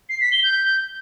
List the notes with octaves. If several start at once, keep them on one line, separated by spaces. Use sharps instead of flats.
C7
B6
G7
G6